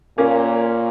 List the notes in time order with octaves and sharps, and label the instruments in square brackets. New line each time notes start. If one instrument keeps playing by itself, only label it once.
[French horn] A#2 [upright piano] A#3 C#4